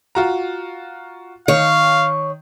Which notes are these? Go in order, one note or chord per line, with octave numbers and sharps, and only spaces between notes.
F4 F#4 A#5
D#3 C#5 F5